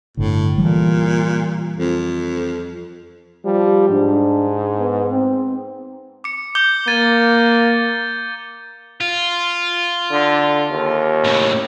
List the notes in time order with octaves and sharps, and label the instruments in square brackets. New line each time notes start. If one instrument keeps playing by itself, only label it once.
[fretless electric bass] G1 D3 [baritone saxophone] A2
[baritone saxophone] A#2 [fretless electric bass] E3 G3
[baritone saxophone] F2
[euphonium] F3 [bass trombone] G3
[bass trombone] G#2 [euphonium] D4
[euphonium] B3
C4
[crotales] D6 C#7
D6 G6 G7
[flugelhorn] A#3 [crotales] G#6 A6 D#7
[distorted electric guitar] F4
[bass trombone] D3
D#2
[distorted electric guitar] A2 C#3